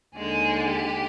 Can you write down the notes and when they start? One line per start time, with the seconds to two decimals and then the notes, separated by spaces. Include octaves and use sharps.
0.15 D#2 D3 G#3 G#4
0.67 G4